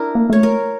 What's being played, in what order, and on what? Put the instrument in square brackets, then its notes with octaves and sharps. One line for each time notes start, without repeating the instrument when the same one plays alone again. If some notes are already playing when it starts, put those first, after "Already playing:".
Already playing: [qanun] D4 E4 A#4
[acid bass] A#3
[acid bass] A3 [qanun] C#5
[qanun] A#4